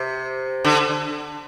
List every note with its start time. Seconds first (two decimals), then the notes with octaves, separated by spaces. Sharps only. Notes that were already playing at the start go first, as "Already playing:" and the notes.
Already playing: C3
0.65 D3